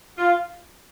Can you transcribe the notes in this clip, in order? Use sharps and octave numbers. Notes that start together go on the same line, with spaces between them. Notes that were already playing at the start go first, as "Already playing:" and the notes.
F4